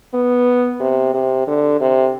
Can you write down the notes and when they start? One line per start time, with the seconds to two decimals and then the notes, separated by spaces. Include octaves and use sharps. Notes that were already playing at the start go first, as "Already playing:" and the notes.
0.14 B3
0.80 C3
1.14 C3
1.47 D3
1.80 C3